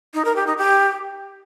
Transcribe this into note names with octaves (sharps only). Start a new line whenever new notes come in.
D#4
A#4
G4
D#4
G4